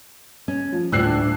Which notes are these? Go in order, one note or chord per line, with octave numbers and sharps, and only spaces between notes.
C#4
F3
D2 A2 G3 E6 F#6 C7
D4